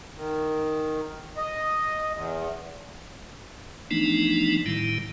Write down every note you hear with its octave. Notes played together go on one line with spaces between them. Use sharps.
D#3
D#5
E2
E3 F3 A3 B3 D4 D#4
A2 D#3 G3 E4